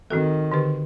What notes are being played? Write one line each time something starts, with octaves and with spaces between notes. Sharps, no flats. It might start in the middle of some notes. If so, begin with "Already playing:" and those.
D#3 C4 F#4 A4
D3 G4 B4